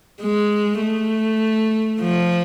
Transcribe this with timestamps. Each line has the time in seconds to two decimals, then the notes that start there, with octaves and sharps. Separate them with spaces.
0.22 G#3
0.81 A3
2.01 F3